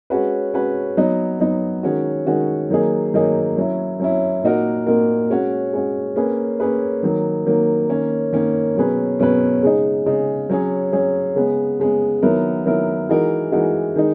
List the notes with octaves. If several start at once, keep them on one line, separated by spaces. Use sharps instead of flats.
G#3 C#4 F#4 B4
G#3 C#4 F#4 B4
F#3 B3 D#4
F#3 B3 D#4
D#3 G#3 C#4 F#4
D#3 G#3 C#4 F#4
D#3 F#3 A#3 D#4 G#4
D#3 F#3 A#3 D#4 G#4
F#3 C#4 E4
F#3 C#4 E4
A#2 A#3 D#4 F#4 A#4
A#2 A#3 D#4 F#4 A#4
G#3 C#4 F#4
G#3 C#4 F#4
A#3 C#4 G#4 B4
A#3 C#4 G#4 B4
D#3 F#3 A#3
D#3 F#3 A#3
D#3 A#3 C#4
D#3 A#3 C#4
B2 F#3 C#4 G#4 B4
B2 F#3 C#4 G#4 B4
C#3 G#3 D#4
C#3 G#3 D#4
F#3 C#4 G#4
F#3 C#4 G#4
C#3 G#3 B3
C#3 G#3 B3
D#3 F#3 B3 E4 A#4
D#3 F#3 B3 E4 A#4
E3 G#3 D#4 F#4 A#4
E3 G#3 D#4 F#4 A#4
D#3 G#3 D#4